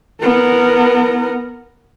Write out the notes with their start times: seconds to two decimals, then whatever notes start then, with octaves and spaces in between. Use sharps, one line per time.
0.22 B3 A#4